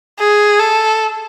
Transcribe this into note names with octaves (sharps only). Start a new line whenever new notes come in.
G#4
A4